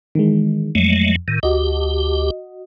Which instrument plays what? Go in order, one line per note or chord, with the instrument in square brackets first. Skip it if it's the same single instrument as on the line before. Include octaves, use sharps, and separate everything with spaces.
[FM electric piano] D#3 E3 G#3
[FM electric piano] F2 [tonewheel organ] F#3 G#3 A3
[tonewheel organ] A2 D#3
[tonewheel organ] D2 G4 [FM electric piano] F#4 D#5